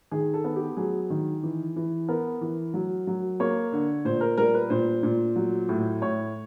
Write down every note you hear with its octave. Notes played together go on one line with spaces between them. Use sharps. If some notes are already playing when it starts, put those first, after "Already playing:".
D#3 G#4
A4
B3
G4
F#3 G#4
D#3
E3
E3
B3 A#4
E3
F#3
F#3
A#3 C#5
D3
A#2 C5
A#4
G3 A#4
B4
A#2 C5
A#2
F#3
A2
A2 C#5